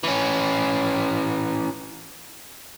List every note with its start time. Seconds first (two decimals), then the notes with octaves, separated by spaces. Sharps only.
0.04 E3 C#4